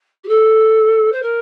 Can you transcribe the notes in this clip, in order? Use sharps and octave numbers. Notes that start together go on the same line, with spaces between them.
G4
A4
C5
A#4